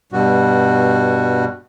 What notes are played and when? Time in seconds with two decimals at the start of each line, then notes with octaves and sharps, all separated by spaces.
0.12 G2 B2 G3 F#4